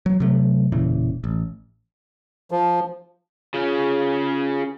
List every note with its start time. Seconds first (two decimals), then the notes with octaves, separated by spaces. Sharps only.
0.06 F#3
0.20 C3 F#3 A3
0.72 E1 A#2 C#3 E3
1.24 A1
2.51 F3
3.54 C#3 C#4 F4 G#4